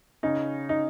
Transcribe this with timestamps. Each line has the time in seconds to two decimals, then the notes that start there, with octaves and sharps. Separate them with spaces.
0.23 C#3 C#4 D#4
0.69 D#4